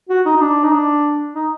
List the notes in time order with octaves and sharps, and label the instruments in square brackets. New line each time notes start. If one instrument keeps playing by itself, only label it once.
[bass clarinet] F#4
D#4
D#4
D4
D#4
D4
D#4